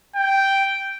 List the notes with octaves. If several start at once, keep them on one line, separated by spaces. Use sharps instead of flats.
G5